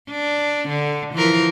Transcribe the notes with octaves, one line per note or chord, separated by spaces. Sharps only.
D4
D3
E3 F3 A#4